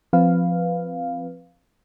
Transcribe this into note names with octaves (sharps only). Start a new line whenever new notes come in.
F3 C4 B4 F5